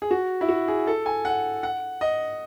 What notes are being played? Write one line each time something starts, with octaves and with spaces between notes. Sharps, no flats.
G#4
F#4
E4
F#4
G#4
A4
G#5
F#5
F#5
D#5